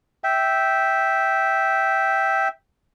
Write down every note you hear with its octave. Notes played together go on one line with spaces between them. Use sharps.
E5 G5